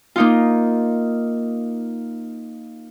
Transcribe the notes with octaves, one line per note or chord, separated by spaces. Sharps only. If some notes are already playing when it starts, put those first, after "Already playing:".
A#3 D#4 F4